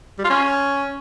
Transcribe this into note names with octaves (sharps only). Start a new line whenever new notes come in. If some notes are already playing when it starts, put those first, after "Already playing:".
G3
F4
C#4